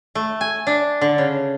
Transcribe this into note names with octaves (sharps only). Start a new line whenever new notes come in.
A3
G#5
D4
D3
C#3